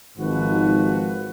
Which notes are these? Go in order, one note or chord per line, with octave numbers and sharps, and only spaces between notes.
G#1 G#2 D#3 F3 F#4 B4